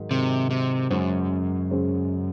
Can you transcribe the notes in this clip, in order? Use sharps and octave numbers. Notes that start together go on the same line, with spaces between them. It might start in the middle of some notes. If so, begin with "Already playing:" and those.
Already playing: G#2 D#3 F#3
G#2 C3 D#3 F#3
C3
F#2 C#3 G#3 C#4 G#4 C5
C#3 G#3 C#4 G#4 C5